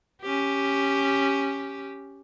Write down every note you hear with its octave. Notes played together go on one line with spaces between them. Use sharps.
C#4 G4